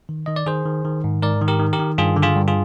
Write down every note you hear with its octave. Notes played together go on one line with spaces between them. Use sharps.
D#3
D#3 D#5
D5
D#3 G#4 C5
D#3
D#3
G#2
G#2 A#4 D5
D#3
G4 A#4
D#3
G4 A#4
D#3
G2 F4 G#4
D3
F4 G#4
G2
F4 G#4